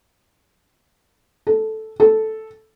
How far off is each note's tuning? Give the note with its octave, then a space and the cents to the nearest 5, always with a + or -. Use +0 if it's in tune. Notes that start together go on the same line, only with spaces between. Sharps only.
A4 -5
A4 -5